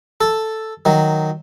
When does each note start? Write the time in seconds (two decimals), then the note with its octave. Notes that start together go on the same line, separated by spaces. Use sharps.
0.21 A4
0.85 D#3 F#3